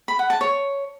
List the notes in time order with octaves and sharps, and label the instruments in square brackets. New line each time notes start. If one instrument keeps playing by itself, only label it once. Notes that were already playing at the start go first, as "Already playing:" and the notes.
[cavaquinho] B5
F#5
A5
C#5